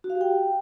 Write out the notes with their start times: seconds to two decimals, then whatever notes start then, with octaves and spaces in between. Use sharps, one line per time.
0.04 F#4
0.10 F5
0.15 G4
0.21 G5